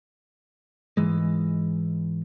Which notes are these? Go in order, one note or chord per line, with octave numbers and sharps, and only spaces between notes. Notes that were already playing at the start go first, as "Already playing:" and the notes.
G#2 E3 G#3